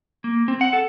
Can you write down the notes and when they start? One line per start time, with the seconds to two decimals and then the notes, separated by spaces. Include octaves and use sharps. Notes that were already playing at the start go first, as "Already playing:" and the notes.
0.24 A#3
0.48 C4
0.61 F#5
0.73 A4